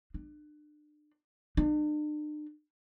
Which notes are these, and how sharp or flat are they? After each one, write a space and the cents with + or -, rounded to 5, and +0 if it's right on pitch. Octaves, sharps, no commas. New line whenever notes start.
D4 +35
D4 +45